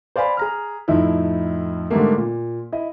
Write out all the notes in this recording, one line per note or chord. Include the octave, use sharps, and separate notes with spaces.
C5 D5 F5 G#5 B5
G#4 A#5 F6
F2 A2 A3 D#4 E4
G#2 D3 G3 A3 A#3
A#2
E4 D#5